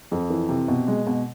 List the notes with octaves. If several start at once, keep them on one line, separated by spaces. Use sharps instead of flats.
F2
E3
C3
B2
G#3
B2